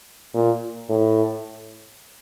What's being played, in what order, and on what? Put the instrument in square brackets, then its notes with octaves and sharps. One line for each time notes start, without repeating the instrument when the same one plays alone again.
[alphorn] A#2
A2